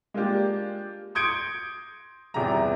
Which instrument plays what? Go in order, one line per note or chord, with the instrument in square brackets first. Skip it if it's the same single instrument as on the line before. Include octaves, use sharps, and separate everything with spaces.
[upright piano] G#3 A#3 D4 F4 G4
C6 D#6 G6 G#6 C#7 D7
G1 E2 C3 F4 G#4 A#5